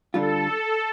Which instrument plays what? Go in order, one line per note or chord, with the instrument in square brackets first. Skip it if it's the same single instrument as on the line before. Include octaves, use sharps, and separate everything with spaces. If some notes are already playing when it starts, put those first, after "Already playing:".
[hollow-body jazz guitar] D3 G3 D4 F4 [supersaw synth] A4